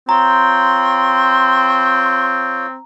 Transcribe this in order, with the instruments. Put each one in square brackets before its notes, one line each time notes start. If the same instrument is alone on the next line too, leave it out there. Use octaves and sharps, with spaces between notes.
[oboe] C4 [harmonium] F4 C#5 G5 [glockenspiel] A#5 [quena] C6